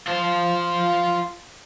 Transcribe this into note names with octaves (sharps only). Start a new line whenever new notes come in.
F4 C5